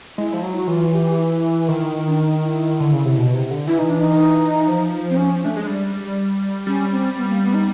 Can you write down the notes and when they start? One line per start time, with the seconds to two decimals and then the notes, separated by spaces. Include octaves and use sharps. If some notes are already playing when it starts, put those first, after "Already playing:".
0.18 G#3 E4
0.33 F3
0.43 F#3
0.56 F#4
0.67 E3 F4
0.93 G4
1.18 E4
1.68 D#3
2.07 D4
2.17 D#4
2.42 E4
2.80 D3
2.93 C#3
3.05 C3
3.17 B2
3.34 C3
3.51 D3
3.67 E3 E4
3.79 D#4
3.90 D4
4.00 D#4
4.67 F3
5.10 C4
5.17 C#4
5.42 A3 D4
5.57 G#3
5.67 G3
6.67 G3 C#4
6.92 C4
7.17 B3
7.29 A#3
7.42 B3
7.54 D#4